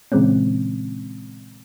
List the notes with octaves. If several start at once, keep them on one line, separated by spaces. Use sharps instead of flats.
A#2 C#3 E3 G#3 C4 C#4